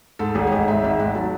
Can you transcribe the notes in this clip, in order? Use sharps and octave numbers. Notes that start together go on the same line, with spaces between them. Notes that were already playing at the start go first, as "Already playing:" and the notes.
G#2 A4
G#1 G#4
C#5
G#2 D#5
G#2 E5
G#1 E5
G#2 F#5
F#3 A5